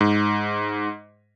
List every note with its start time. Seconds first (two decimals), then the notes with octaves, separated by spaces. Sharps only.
0.01 G#2